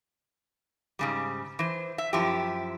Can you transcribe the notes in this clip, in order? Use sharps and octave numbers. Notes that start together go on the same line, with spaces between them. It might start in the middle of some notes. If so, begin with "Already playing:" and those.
G#2 C#3 G3
E3 C5
E5
F#2 F3 E4 G4